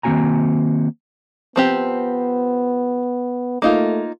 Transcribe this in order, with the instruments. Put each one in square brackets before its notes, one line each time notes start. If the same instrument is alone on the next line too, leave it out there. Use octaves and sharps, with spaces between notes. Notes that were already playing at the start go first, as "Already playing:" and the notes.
[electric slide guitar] D#3 A#3 C4 F#4 G#5 A#5
[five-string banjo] F3 C4 G4 [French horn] B3
[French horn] A3 [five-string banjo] A#3 D#4 F4